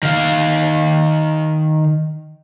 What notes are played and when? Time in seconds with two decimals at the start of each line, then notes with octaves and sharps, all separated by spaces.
0.03 D#3 F5